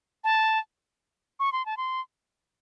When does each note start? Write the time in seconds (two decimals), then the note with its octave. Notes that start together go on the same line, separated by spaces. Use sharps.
0.24 A5
1.40 C#6
1.53 C6
1.66 A5
1.77 C6